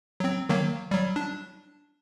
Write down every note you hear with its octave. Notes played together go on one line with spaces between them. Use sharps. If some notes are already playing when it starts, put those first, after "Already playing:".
F#3 C4
D#3 F#3 A#3
F#3 G3
D4